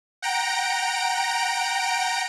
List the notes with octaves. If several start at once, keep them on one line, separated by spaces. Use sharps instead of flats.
F#5 G5 A#5 A#6 D7